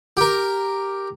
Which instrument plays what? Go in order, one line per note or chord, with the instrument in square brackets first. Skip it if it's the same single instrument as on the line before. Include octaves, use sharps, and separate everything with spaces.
[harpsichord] G4 A#4